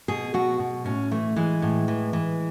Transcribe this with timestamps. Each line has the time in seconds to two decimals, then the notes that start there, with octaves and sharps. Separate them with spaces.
0.08 B2 G#4
0.34 B2 F#4
0.59 B2
0.85 A2 C#4
1.11 E3 A3
1.36 E3 G#3
1.62 A2
1.88 E3
2.13 E3